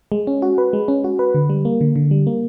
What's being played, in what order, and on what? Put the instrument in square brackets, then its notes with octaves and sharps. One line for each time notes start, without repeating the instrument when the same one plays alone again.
[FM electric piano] G#3
C#4
F#4
B4
G#3
C#4
F#4
B4
D3
G3
A#3
D3
D3
G3
A#3